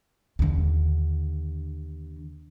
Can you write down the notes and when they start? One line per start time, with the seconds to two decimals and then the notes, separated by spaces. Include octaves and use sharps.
0.39 D#2 D3